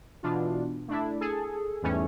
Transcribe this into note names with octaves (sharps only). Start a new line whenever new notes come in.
B2 E3 D4 F4
A3 D4 E4
G#4 A4
E2 G#2 E3 G3 A3 C#4